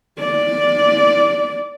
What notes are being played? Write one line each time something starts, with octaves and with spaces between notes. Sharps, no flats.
D5